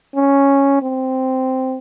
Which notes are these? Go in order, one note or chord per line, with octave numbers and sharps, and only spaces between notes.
C#4
C4